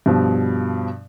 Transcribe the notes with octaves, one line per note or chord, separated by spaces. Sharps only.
G2 B2 F3